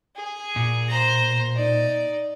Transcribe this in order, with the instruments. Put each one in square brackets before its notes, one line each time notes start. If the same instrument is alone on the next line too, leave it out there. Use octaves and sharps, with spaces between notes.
[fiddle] G#4
[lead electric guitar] A#2
[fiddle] C5 A#5
D#4 D5